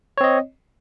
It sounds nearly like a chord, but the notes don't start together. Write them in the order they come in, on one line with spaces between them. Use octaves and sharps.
C#5 C4 D#5